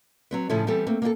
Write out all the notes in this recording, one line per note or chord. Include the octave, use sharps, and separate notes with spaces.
F#3 C4 B4
A2 C#3 F3 C#4 E4 A4
E3 G3 B3 C4 A4
A3 A#3 C4
A#3 C4 E4 A4